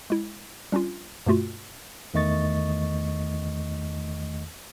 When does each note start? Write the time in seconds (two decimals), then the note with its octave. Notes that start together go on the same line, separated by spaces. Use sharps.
0.10 G#3 E4
0.72 G3 C#4 D4 F4
1.26 G2 B2 A3 F4 F#4
2.14 E2 D#3 A3 D#5 C#6 A6